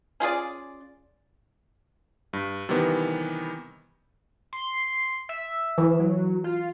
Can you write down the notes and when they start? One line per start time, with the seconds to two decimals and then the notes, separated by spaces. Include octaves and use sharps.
0.20 C#4 F4 G#4 D5
2.33 G2
2.69 C3 D#3 E3 G3 B3
4.53 C6
5.29 E5
5.78 E3
5.99 F#3
6.44 F4